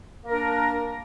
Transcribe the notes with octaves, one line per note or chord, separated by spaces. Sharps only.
A#3 D4 A#4